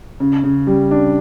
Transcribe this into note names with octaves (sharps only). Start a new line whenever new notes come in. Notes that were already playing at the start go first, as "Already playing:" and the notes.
C#3
C#3
G3
D4